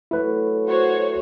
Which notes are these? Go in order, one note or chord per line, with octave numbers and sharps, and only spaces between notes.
F#3 A3 E4 B4
F#4 C5 C#5